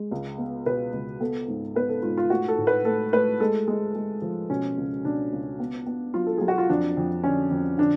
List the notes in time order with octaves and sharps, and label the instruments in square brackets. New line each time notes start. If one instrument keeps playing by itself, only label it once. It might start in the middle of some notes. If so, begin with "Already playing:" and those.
Already playing: [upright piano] G#3
C#2
B3
B2 B4
C#2
B3 A4
G#2
B3 B4
A4
G#2 F4
F4
A3 F#4
A4
A2
B4
A3 A4
A3 B4
G#3 A4
G#3
G#3
F3
B2 C#4
C#2
B2 D4
C#2
B3
B3
F#3 F4
A4
F#3 G#4
F#4
F4
F2 D4
F2
D3 C#4
F2
D3 D4